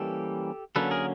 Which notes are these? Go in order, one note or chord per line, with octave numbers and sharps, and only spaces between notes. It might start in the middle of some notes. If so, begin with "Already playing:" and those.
Already playing: E3 G3 A#3 C#4 G4 A4
D3 F#3 A#3 C#4 A4 B4
G#4 A#4